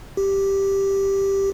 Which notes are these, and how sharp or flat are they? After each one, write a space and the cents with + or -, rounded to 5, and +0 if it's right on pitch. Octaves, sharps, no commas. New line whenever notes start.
G4 +0